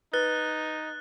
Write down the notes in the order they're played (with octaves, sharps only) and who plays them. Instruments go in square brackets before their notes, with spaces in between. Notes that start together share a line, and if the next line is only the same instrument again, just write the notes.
[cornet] D#4 [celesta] B4 [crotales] F#6 [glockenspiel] A6 G7